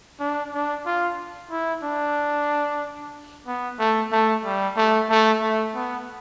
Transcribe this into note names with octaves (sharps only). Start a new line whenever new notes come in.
D4
D4
F4
E4
D4
B3
A3
A3
G3
A3
A3
A3
B3